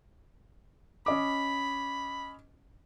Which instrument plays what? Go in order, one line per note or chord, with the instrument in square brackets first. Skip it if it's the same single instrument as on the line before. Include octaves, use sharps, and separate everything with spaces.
[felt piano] C#4 D#5 D6 [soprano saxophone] B5